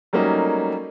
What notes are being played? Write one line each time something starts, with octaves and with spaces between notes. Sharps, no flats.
F#3 G3 A3 A#3 C#4 D#4